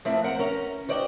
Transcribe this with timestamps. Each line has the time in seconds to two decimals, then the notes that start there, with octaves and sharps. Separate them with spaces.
0.05 F3 A3 A#3 C4 E4
0.24 A#4 C5 F#5
0.39 C#4 A#4
0.89 F#4 C5 D5 D#5 F#5 G5